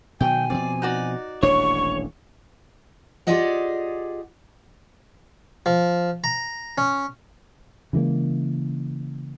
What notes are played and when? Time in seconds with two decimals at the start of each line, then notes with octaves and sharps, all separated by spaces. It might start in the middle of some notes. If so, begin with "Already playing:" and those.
0.21 B2 D#3 F#3 G5 G#5
0.50 B2 F3 C4 D5
0.82 D#4 F#4 D5
1.43 D#1 A1 D4 C#5 C#6
3.27 F4 G4 G#4 D5 D#5 F#5
5.66 F3
6.24 A#5
6.78 C#4
7.93 C#3 E3 G#3 A#3